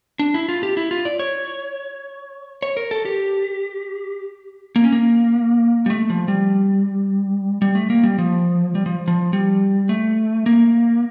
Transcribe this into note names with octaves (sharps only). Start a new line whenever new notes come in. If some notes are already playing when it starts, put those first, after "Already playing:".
D4
E4
F4
G4
E4
F4
D5
C#5
C#5
A#4
A4
G4
A#3
C#4
A#3
G3
A3
F3
G3
G3
A3
A#3
G3
F3
G3
F3
F3
G3
A3
A#3